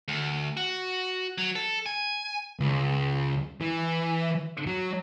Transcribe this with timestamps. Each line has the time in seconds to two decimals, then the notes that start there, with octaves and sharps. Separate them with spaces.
0.08 D2
0.57 F#4
1.38 F#3
1.55 A4
1.86 G#5
2.60 C#2
3.61 E3
4.67 F#3